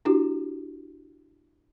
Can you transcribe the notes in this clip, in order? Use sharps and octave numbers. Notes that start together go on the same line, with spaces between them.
D4 E4 F#4 G4